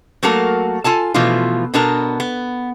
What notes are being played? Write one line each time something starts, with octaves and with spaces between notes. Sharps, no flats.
F#3 A3 A#3 F#4 A4 A#4
F4 A4 G#5 A5
B2 E3 F3 A3 F4
B2 B3 D4 A4 A#4 A#5
B3